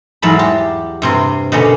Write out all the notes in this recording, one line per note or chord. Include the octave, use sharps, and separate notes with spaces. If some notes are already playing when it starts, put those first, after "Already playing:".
E2 G#2 F#3 A5 B5
G4
G2 C3 C6
B2 D3 A#3 C#4